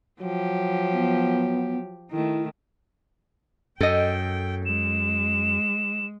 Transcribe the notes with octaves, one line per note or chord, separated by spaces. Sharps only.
F3 F#3 G4
B3
D#3 A3 E4
F#2 A4 D#5 G5
G#3 E7